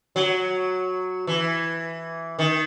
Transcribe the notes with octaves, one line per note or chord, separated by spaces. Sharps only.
F#3
E3
D#3